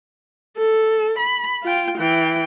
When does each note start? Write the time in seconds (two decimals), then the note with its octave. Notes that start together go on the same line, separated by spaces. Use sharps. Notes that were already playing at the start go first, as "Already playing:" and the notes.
0.57 A4
1.18 B5
1.63 F4 G5
1.98 E3 G5